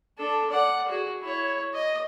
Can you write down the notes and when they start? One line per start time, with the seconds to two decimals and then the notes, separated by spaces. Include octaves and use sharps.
0.18 D4 A4
0.50 D5 F#5
0.88 F#4 G#4
1.21 E4 C#5
1.74 D#5